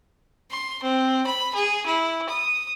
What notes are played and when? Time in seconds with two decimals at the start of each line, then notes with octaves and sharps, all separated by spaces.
0.51 C6
0.83 C4
1.26 B5
1.54 G#4
1.86 E4
2.29 D#6